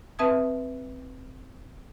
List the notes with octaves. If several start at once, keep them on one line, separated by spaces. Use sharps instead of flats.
C4 B4 E5 A5 D#6 G#6